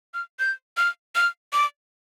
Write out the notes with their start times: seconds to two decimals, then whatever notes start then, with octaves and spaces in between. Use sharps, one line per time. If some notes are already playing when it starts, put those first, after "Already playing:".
0.14 F6
0.39 G6
0.77 F6
1.15 F6
1.53 D6